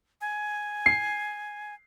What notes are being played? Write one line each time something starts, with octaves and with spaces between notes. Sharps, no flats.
G#5
C7